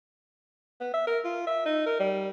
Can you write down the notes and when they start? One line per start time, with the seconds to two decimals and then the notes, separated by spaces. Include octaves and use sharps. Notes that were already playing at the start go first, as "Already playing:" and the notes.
0.81 B3
0.94 E5
1.07 A#4
1.25 F4
1.47 E5
1.66 D#4
1.86 A#4
2.00 G3